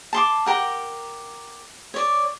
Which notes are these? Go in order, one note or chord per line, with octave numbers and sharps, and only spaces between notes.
A5 C6 D6
G4 A#4 F#5
C#5 D5